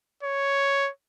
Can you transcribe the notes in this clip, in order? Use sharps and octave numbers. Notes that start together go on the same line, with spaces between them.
C#5